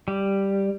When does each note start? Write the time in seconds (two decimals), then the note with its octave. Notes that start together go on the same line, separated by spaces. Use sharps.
0.08 G3